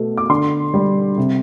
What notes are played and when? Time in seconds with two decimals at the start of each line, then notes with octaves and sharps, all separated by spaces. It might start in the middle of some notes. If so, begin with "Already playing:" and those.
Already playing: B2 A3
0.17 D6
0.29 D3 C6
0.74 G3
1.17 C3